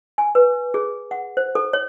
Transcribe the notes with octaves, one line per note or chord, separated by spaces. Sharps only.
G#5
B4
G#4
F#5
C5
A4
C#5